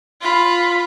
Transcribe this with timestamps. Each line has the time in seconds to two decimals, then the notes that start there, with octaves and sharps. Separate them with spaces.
0.21 F4 B5